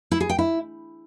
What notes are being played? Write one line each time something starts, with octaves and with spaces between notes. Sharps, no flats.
E4
G#4
G5
E4